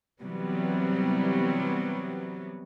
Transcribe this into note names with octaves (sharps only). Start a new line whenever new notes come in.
C3 E3 F#3 G3 B3